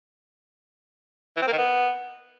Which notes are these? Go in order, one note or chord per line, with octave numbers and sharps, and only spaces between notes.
E3
C4
A#3
D#3
B3